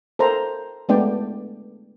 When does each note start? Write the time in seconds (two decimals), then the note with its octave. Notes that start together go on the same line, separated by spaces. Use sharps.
0.19 A4 A#4 C5 A#5
0.89 G#3 A3 B3 D4 D5 G5